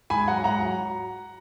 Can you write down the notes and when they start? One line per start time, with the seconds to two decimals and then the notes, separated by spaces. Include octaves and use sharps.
0.10 G#2 G#5 B5
0.28 F#3 F#5 A#5
0.44 G#2 F#5 A#5
0.62 F#3